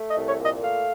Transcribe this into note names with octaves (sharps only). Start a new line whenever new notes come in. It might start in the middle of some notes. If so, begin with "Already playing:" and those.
Already playing: A3
D#5
C2
C#5
A#2
D#5
A3 F5